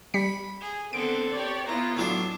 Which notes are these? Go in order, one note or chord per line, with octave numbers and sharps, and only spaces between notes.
G3 B5 B6 C#7
G#4
D3 B3 C4 A4 D7
G4 C#5 D5
B3 E4 F4 A#5
A2 F#3 D4 F5